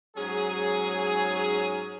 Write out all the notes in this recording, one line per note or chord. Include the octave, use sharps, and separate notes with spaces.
G#2 F#3 C#4 G#4